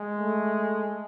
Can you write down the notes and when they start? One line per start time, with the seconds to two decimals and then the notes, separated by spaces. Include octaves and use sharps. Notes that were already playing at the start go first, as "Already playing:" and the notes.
Already playing: G#3
0.18 A3